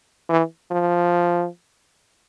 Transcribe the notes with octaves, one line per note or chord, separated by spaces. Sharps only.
E3
F3